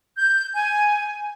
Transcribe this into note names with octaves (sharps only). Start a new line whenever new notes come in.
G6
G#5